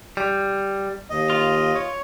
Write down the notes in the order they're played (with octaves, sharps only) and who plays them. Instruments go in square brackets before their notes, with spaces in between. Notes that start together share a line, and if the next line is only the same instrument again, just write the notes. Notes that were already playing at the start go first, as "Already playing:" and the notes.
[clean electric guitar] G3
[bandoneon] D#2 D#5
[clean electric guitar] F4
[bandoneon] C#5